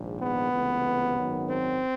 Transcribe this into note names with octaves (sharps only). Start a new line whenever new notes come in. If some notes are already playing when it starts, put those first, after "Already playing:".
Already playing: A#1 G#2 D#3
B3
C#2 C3 E3 A3
G#1 F#2 D#3 F#3
C4